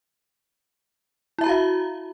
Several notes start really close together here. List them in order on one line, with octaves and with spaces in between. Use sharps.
E4 E5 A#5 F#4 F5